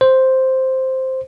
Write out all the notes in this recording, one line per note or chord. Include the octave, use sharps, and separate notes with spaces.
C5